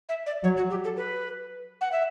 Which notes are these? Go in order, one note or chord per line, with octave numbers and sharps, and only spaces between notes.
E5
D5
F#3 C#5
F#4
G4
A4
B4
F#5
E5